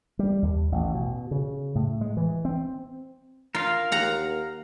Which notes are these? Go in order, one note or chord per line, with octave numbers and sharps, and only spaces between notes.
G3
D#2
A1
B2
C#3
A2
G#3
E3
C4
F4 A#4 F5
D#2 F#5 A#5